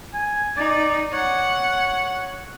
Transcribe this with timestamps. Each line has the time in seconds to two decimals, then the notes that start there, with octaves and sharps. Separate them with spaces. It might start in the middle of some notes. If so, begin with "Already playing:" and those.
0.14 G#5
0.57 D#4 D5
1.13 C#5 F#5